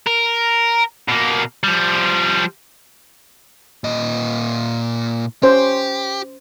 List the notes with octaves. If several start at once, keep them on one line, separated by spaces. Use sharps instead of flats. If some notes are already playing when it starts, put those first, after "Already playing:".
A#4
B2 A#3
F3 G3
A#2 D#5
C#4 G4 C5